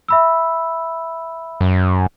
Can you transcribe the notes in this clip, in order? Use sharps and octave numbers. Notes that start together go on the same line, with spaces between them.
E5 B5 E6
F#2